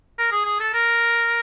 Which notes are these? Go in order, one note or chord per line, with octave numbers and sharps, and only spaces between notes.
A#4
G#4
G#4
A4
A#4